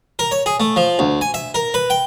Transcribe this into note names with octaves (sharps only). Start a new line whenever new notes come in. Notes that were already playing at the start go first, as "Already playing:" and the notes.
A#4
C#5
G#4
A3
F3
D2
G#5
E5
A#4
B4
G5